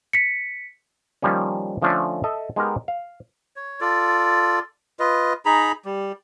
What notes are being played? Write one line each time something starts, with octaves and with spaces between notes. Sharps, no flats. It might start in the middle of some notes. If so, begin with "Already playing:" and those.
B6 C#7
D#3 F3 G3 A#3 C#4
D3 F3 A3 C#4 D4
A4 D#5 E5
G#3 B3 D#4 F#4 G4 A#4
F5
C#5
F4 A4 D5
F4 B4 D#5
D#4 G#4 A#5 B5
G3